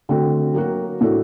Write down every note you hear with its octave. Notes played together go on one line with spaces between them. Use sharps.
D3 A3 C4 F#4
F#3 A#3 F#4
A2 A3 D4 F#4